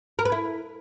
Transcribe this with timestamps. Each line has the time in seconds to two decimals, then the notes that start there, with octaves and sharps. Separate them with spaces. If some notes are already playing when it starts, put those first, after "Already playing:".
0.19 A#4
0.25 B4
0.32 E4